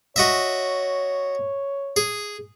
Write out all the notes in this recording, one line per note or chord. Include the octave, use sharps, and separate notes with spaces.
F#4 C#5 D#5 E5
G#4